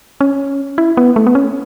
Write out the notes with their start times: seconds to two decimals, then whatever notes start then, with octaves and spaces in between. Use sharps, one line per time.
0.21 C#4
0.78 E4
0.97 B3
1.16 A3
1.27 B3
1.35 C#4